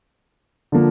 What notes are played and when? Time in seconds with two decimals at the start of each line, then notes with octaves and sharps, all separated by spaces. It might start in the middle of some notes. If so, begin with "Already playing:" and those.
0.72 D3 F3 A#3